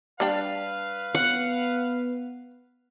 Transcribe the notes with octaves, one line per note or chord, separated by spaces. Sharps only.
G3 D4 B4 F5 G5
B3 F#5